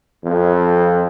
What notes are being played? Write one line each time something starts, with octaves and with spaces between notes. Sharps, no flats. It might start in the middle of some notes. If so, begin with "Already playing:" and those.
F2